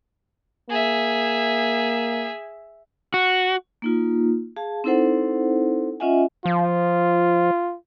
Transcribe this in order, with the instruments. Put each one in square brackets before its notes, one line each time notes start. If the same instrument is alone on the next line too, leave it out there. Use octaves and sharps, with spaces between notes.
[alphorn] A#3 [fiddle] G#4 E5
[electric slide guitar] F#4
[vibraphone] A#3 D#4 F4
G#4 F5 A5
C4 D#4 E4 A4 C5 F#5
C#4 F4 D#5 E5 F#5 G#5
[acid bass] F3 [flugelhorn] F4